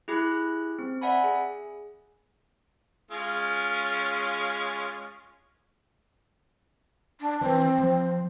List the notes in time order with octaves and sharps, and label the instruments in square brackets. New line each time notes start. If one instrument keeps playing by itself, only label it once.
[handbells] E4 G4 G#4 B5 F#6
C4
D5 E5 F#5 G#5 B5
G#4
[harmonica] G#3 C#4 F4
[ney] D4
[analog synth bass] E3 [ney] C4
[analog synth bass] F3